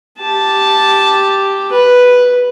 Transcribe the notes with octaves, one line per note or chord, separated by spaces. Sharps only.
G4 A5
B4